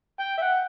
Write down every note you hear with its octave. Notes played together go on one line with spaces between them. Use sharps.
G5
E5
F#5